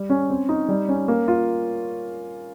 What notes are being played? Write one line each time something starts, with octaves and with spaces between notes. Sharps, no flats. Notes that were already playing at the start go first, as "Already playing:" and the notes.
Already playing: G3
C#4
C4
D#4
G3
C#4
A#3
F4